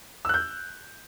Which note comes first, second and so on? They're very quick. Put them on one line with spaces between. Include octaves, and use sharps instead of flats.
E6 F#6 G6